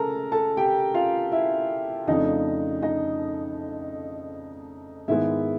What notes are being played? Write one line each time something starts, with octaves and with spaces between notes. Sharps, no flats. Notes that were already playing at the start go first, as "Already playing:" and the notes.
Already playing: C#3 G#3 A4 A#4 A5 A#5
A4 A5
G4 G5
F4 F5
E4 E5
F2 C#3 F3 A3 D4 D#4 D#5
D#4 D#5
G#2 D#3 G#3 B3 E4 E5